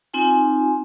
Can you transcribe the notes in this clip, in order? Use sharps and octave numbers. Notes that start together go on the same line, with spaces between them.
C4 D#4 F4 G#5